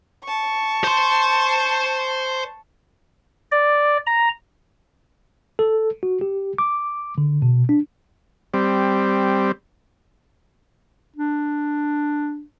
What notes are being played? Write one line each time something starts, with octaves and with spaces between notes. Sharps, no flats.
A5 C#6
C5 C6
D5
A#5
A4
F#4
G4
D6
D3
B2
D4
G3 C4
D4